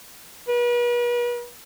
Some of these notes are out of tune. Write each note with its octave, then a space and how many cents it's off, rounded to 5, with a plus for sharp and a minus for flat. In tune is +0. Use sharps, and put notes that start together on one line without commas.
B4 -40